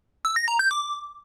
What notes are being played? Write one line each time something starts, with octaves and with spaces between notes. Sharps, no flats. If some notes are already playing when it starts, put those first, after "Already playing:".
E6
A#6
A#5
G6
D6